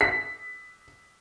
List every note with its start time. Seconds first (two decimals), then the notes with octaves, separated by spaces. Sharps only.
0.01 B6